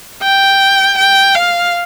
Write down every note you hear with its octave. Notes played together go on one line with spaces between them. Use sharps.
G5
G5
F5